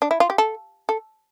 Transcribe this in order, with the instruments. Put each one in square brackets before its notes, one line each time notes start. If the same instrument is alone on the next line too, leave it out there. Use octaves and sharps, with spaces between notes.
[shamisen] D4
E4
F4
G4
A4
A4